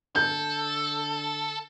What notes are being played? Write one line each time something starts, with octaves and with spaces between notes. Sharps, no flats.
D3 A4 G6